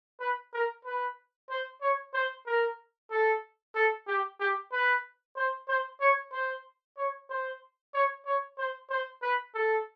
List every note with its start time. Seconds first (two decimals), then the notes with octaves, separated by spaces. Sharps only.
0.20 B4
0.53 A#4
0.85 B4
1.50 C5
1.81 C#5
2.14 C5
2.47 A#4
3.11 A4
3.75 A4
4.07 G4
4.40 G4
4.72 B4
5.36 C5
5.68 C5
6.00 C#5
6.33 C5
6.97 C#5
7.30 C5
7.94 C#5
8.26 C#5
8.58 C5
8.90 C5
9.23 B4
9.54 A4